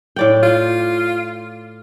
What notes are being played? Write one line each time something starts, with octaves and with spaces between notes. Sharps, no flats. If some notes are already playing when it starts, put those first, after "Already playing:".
A2 D5 G5
F4